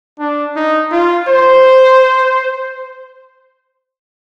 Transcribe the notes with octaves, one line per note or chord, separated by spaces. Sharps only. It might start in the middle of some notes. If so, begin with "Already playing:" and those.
D4
D#4
F4
C5